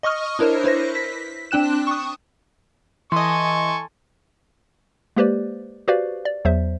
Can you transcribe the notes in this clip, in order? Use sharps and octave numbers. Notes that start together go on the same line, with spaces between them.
D#5 C#6 D#6 F6
D4 E4 A#4 C5 C#5
E4 B4 C5 A#6
B6
C4 D4 G5 F#6 E7
C#6 D#6
E3 A4 D#5 G#5 C6 C#6
G#3 A#3 G4 B4 C5 D5
F#4 G4 B4 C5 D5 F5
D5
E2 F#3 C5 E5